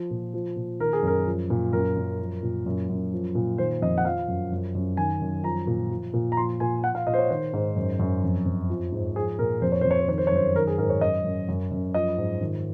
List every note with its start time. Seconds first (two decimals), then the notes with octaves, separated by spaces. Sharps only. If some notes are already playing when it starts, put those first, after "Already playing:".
Already playing: F3
0.11 A#2
0.34 F3
0.56 A#2
0.80 D#3 A#4
0.93 G#4
1.03 F#2 A#4
1.26 F3
1.50 A#2
1.73 F#2 A#4
1.96 F#2
2.20 F3
2.43 A#2
2.66 F#2
2.89 F#2
3.12 F3
3.35 A#2
3.58 D#3 C5
3.82 F2 D#5
3.98 F#5
4.05 F3 F5
4.28 F#2
4.52 F#2
4.75 F#2
4.97 D#3 G#5
5.22 F#2
5.44 F3 A#5
5.67 A#2
5.91 F3
6.13 A#2
6.32 A#5
6.37 F3 C6
6.60 A#2 G#5
6.83 F3 F#5
6.95 F5
7.07 A#2 D#5
7.14 C5
7.18 C#5
7.30 D#3 C5
7.53 G#2
7.76 F#2
7.99 F#2
8.24 F2
8.46 F2
8.70 F3
8.92 G#2
9.16 F3 G#4
9.39 A#2 A#4
9.62 F2 C5
9.72 C#5
9.81 F2 C5
9.91 C#5
10.00 C5
10.08 D#3 C#5
10.18 C5
10.27 C#5
10.32 F#2 C5
10.55 D#3 A#4
10.67 G#4
10.78 G#2 A#4
10.90 C#5
11.01 F#2 D#5
11.24 F#2
11.48 F#2
11.71 F#2
11.94 F3 D#5
12.18 G#2
12.41 D#3